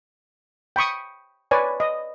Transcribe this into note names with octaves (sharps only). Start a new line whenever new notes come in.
G5 B5 C#6 D#6
B4 C#5 D5 G#5
D#5